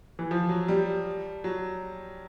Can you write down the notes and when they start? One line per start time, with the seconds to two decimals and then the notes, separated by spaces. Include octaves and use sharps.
0.19 E3
0.31 F3
0.49 F#3
0.68 G3
1.44 F#3